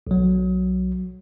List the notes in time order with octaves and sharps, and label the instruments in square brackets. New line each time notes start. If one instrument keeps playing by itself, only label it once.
[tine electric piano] B1 F#3